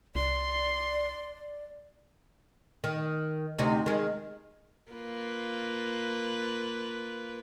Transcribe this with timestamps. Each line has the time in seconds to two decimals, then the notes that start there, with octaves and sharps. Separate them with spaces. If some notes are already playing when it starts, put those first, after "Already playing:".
0.15 C2 D5 C6
2.84 D#3
3.58 D2 C3 D#4
3.86 D#3 G#3
4.92 A#3 F4 B4